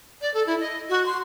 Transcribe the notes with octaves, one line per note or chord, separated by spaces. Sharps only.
D5
A4
E4
D#5
F#4
C6